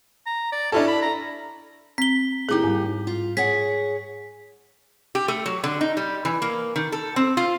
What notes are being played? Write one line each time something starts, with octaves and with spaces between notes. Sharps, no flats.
A#5
D5
C#4 D4 E4 A4
B5
A#5
C4 B6 G7
D#2 D#4 E4 G4 G#4
G#2 G3
F4
G#4 C#5 F#5 B6
G4
A3
F#3
D3
D#4
G3
E3
A#3
D#3
A4
C4
F4